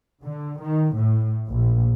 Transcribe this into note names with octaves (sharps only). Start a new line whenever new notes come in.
D3
D#3
A2
A#1